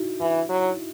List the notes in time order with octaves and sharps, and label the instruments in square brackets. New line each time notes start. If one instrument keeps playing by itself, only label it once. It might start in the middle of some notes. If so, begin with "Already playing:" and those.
Already playing: [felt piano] D#4 E4 F#4
[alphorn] E3
F#3